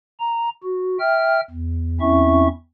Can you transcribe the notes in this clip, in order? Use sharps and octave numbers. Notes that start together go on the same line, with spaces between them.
A#5
F#4
E5 G5 F6
E2
E2 C4 C#4 E4 E5 C#6